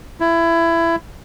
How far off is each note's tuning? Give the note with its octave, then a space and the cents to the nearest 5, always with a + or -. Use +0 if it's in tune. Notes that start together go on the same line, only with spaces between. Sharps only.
E4 +20